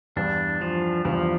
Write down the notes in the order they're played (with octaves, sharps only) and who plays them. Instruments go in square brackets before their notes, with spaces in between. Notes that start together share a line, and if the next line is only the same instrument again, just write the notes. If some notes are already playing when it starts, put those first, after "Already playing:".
[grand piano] E2 G2 [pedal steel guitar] D4
[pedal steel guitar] F3
[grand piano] E2 G2 [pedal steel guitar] F3